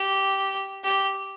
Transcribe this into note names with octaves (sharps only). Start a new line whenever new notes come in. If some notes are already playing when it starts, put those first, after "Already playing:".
Already playing: G4
G4